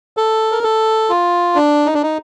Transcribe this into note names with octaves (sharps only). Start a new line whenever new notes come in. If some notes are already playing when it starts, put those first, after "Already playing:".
A4
A#4
A4
F4
D4
D#4
D4
D#4